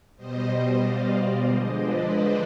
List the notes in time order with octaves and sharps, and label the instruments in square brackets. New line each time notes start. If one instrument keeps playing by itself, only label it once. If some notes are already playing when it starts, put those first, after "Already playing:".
[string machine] B2 G3 C5 D#5
C5 D#5
D5 F5
C5 D#5
D3 F3 G#3 C5 D#5
B4 D5